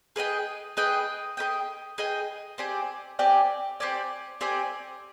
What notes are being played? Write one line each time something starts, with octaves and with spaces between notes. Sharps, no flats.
G#4 B4 D#5 G5
G#4 B4 D#5 G5
G#4 B4 D#5 G5
G#4 B4 D#5 G5
C4 G4 D5 G#5
C4 G4 D5 G#5
C4 G4 D5 G#5
C4 G4 D5 G#5